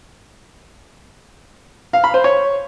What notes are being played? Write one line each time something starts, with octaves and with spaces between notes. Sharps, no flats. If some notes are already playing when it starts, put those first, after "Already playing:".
F5
B5
C5
C#5